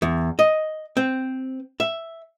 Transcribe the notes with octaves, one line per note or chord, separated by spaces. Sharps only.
E2
D#5
C4
E5